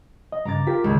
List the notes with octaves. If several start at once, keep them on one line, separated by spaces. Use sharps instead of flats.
D#5
G2 C#3 A#5 D6 A6
F4 G4 A#4 B6
C#2 D3 G#3